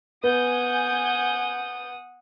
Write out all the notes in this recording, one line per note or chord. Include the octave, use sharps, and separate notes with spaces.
B3 F#5 G#5 D#6 G6